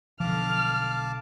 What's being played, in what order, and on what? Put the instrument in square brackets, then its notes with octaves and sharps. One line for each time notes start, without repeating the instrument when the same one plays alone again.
[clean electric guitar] B1 D3 [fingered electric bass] F3 [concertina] F5 A5 D6 [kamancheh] F6